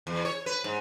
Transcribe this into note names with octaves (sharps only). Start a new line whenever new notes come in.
E2
C#5
B4
G#2